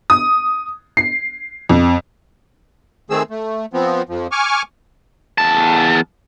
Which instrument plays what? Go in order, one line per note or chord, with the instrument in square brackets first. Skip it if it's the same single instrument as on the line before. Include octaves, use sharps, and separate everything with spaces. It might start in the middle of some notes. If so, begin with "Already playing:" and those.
[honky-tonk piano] D#6
C7
F2
[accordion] D#3 A3 C4 G#4 E6
A3
F3 B3 C4
F2 F3
G#5 C#6 D6 F6
[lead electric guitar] E2 A5